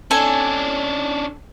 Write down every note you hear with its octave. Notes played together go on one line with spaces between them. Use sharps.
C#4 D4 A4 G#5